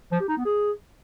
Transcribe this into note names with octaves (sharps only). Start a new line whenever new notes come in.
F3
G4
D#4
B3
G#4